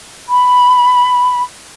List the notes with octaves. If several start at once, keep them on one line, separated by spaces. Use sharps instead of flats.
B5